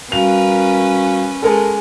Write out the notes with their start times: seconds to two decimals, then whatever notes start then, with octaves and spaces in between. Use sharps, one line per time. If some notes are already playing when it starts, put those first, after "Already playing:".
0.12 G3 C#4 F#4 A#4 B4 F5 F7
1.42 G#3 A4 A#4